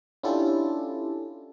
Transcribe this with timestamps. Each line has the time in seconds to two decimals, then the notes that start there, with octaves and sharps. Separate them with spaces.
0.23 C#4 D4 E4 F4 G4 A4